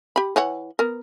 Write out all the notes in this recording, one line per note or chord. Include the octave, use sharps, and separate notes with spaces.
G4 B5
E3 C#5 F#5
B3 A#4